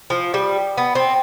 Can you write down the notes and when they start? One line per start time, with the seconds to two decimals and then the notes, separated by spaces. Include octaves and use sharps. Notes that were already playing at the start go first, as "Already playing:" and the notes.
0.10 F3
0.34 G3
0.77 B3
0.95 C4